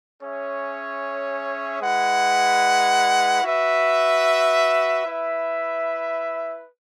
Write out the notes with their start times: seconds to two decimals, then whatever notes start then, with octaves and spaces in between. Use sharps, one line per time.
0.21 C#4 G#4 C#5 E5
1.82 G#3 E4 B4 F#5
3.43 F#4 B4 E5
5.05 E4 B4 E5